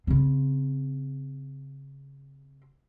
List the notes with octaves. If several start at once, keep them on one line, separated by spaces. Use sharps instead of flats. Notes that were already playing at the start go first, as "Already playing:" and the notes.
C#3 C4